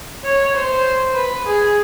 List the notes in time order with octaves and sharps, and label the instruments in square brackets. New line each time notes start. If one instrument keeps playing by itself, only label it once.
[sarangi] C#5
C5
B4
G#4